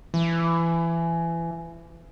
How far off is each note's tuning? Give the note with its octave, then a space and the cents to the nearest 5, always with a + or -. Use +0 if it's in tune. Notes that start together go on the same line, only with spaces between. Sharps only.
E3 +25